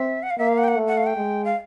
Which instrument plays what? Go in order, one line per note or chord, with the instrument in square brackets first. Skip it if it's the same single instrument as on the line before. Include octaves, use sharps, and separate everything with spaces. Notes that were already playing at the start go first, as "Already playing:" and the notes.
Already playing: [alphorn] C4 [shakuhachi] E5
[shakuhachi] F#5
F5
[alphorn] A#3 [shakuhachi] E5
[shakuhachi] F5
F#5
G5
F#5
[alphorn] A3
[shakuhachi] F#5
F5
F#5
G5
[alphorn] G#3
[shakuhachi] F5